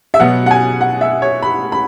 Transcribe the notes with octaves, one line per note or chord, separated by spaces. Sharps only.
E5
B2 F#3 B3 F#5
F#5
G#5
F#5
E5
C#5
B5
B5